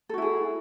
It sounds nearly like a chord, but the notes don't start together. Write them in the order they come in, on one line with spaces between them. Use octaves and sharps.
A4 F#4 E4 G#4